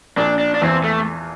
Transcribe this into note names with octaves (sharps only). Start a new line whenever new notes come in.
A#1 A#2 D4
D4
D4
E2 E3 C4
A3